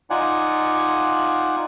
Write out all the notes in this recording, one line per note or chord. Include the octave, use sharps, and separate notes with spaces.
D#4 F4 D5 F#5 G#5